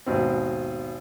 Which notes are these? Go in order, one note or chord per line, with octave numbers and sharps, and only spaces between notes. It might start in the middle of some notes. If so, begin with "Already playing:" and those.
G#1 D#2 B2 C4